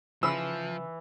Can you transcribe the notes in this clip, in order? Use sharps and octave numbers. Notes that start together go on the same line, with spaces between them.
C#3 E3 F3 B4 E6